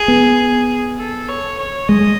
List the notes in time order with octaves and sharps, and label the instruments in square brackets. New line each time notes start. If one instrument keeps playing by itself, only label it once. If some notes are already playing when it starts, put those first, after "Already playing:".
Already playing: [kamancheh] G#4
[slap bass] B3
[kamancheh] A4
C#5
C#5
[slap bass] G#3 [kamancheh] D#5